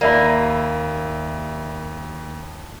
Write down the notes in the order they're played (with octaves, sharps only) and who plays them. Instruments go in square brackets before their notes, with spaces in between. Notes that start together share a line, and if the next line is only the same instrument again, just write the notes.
[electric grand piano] D#2 D#7 [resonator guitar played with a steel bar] A#3 [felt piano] D5 E5 B5